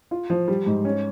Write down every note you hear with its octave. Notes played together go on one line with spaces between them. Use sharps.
F4
F3
G3
G#2
C#4